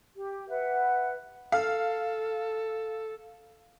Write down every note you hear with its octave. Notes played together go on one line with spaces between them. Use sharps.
G4
B4 E5 F#5
A4 F5